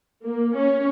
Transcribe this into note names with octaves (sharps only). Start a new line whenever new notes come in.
A#3
C#4